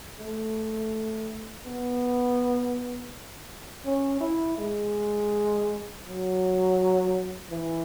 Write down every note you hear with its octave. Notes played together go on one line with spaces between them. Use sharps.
A3
B3
C#4
E4
G#3
F#3
E3